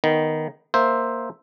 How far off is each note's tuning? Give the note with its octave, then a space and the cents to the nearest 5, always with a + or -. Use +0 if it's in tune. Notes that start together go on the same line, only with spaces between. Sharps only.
D#3 +0 B3 +0
A#3 +0 C5 +5 E5 +0